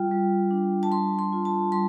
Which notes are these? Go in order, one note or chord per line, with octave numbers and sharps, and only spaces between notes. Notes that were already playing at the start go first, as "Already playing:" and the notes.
Already playing: G3 F4 G5
G3
D4
A5
G3 C6
C6
F4
A5
G3 C6